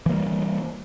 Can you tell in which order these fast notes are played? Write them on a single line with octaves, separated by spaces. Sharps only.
E3 A#3 G3